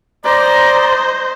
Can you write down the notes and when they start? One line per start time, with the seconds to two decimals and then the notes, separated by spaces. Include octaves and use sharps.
0.25 C5 D5 D#5 A#5